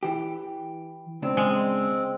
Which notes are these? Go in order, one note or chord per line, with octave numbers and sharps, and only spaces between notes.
E3 G4
C#2 C#3 C4 D4
G#3